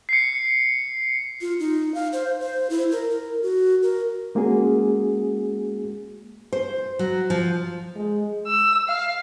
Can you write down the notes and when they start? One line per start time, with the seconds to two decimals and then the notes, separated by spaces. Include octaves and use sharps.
0.09 C7 C#7
1.41 F4
1.60 D#4
1.94 F5
2.13 C5
2.40 C5
2.70 E4
2.92 A#4
3.11 A#4
3.42 F#4
3.83 A#4
4.35 G#3 A#3 C#4 F#4 G#4
6.53 C5
6.99 F#3
7.30 F3
7.96 G#3
8.47 E6
8.89 F5